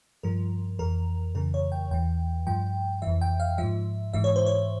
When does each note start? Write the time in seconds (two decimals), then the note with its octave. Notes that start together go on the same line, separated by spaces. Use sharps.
0.23 G2 F3 A#4
0.79 F2 E3 A#4
1.35 F2 C#3 E3 A#4
1.54 C#5
1.72 G5
1.91 E2 E3 G5
2.47 G2 F3 G5
3.02 F2 E3 E5
3.21 G5
3.40 F5
3.58 G#2 F3 E5
4.13 G#2 E3 E5
4.24 C#5
4.36 C5
4.46 C#5